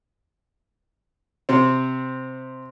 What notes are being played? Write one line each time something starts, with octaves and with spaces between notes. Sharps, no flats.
C3 C4